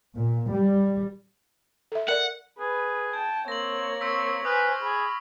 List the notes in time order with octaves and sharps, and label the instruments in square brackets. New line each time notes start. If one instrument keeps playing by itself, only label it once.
[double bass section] A#2
G3
[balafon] A4 E5
[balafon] A#4 D5 [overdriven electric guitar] F#5
[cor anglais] G#4 [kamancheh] B4
[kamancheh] G5 A5 [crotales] G#6
[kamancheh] A#3 C#5 [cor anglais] C4 [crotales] A#6 F#7
[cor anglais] C4 [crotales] C#6 E6 B6
[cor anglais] B4 [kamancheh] C5 G#5 [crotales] D#6 F6
[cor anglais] G#4 [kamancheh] B5